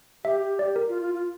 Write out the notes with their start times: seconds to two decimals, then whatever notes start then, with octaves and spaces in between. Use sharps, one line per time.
0.24 G4 E5
0.42 G4
0.59 G4 D5
0.76 A#4
0.89 F4
1.02 F4
1.15 F4